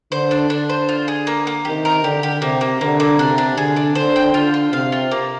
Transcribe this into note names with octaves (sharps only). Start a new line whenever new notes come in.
D3 C5
D4
D3 D4
C5
F4
G#4
A#3
A#3
C3 D#3 G4
A#4
D3 G4
G4
C3 A#3
A#3
D3 A#3
A#3
C3 D4
D4
D3 G#4
D4
D3 C5
G5
D3 F4
F4
C3 F5
F4
A#3